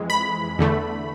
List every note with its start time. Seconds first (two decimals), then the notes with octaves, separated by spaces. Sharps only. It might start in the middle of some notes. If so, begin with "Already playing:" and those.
Already playing: F2 E3 G#3
0.10 B5
0.59 E2 D3 A3